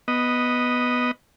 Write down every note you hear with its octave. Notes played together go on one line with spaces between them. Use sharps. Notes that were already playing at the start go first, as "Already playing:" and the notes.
B3 D#5